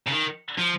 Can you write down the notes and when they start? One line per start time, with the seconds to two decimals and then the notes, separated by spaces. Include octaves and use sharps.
0.07 C#3
0.12 D#3
0.59 F3